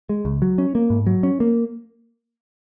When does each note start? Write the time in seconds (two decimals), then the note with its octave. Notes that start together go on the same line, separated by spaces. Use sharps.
0.09 G#3
0.25 C#2
0.42 F#3
0.58 C#4
0.75 A#3
0.90 G#2
1.07 F#3
1.23 C#4
1.40 A#3